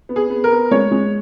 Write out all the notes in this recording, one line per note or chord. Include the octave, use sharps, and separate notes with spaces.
B3
G#4
B3
A#4
B3
G#3 C#5
G#3